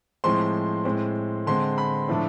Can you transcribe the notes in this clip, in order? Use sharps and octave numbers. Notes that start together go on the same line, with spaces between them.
A2 F3 G#3 C4 C6
A2 G#3 C4
D3 G#3 C4 C6
B5
A2 F3 A3 D4